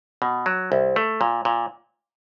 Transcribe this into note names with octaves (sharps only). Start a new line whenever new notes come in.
B2
F#3
C2
A3
A#2
A#2